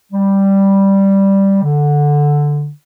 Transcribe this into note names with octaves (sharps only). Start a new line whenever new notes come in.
G3
D3